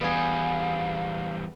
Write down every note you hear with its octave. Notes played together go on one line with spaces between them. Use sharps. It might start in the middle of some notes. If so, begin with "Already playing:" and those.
E2 G3 B3 G#4 F5